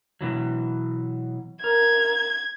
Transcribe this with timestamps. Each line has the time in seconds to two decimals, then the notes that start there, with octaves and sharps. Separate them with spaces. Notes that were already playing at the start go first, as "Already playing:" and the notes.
0.21 B2 E3 F#3
1.64 A#4 G#6